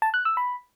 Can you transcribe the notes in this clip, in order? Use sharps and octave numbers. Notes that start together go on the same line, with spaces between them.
A5
F#6
E6
B5